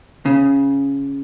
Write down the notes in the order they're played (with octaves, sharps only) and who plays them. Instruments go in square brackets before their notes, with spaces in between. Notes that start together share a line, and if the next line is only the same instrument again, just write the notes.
[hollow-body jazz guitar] C#3